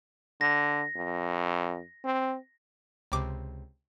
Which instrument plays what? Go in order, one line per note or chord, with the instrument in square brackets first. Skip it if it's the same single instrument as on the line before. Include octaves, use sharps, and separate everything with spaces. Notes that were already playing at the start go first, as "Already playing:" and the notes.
[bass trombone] D3 [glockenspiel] A#6
[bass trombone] F2
C4
[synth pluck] C#2 C3 D6